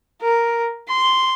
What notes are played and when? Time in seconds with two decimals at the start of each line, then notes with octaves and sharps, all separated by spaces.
0.22 A#4
0.89 C6